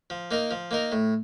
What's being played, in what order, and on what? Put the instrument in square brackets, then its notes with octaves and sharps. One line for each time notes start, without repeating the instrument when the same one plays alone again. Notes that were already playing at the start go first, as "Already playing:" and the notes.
[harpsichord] F3
A#3 D#4 A#4
F3
A#3 D#4 A#4
A2